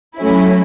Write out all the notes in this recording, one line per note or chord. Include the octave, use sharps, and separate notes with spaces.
F#3 A3 C#4 E4